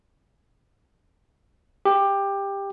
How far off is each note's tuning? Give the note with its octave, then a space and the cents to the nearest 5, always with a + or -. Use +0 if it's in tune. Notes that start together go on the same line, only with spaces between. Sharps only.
G4 +15